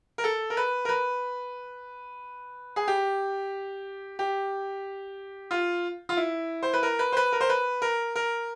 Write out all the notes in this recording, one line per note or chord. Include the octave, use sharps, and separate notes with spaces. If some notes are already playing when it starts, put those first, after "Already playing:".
A#4
A4
A#4
B4
A#4
B4
G#4
G4
G4
F4
F4
E4
C5
B4
A#4
B4
C5
B4
A#4
C5
B4
A#4
A#4